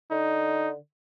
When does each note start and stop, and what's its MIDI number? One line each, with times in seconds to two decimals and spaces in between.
0.11 0.75 50
0.11 0.70 63